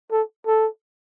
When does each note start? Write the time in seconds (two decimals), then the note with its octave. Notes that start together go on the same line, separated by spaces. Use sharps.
0.12 A4
0.46 A4